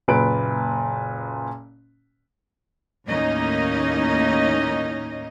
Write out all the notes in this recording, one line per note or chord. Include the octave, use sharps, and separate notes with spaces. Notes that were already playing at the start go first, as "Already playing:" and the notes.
F#1 A#2 B4 D7
D#2 A2 A#3 C#4 D#4 D#5